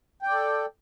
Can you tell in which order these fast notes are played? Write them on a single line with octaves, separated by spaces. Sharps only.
G5 D5 A4